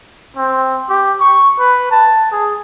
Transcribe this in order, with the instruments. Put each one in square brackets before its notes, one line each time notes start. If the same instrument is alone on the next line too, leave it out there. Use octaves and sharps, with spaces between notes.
[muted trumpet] C4
G4
C#6
B4
A5
G#4